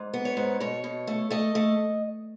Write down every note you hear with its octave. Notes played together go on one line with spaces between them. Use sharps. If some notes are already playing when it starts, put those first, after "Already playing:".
Already playing: G#2
B3
C#5
G#2
B2 C#5
B2
A3
A3 D#5
A3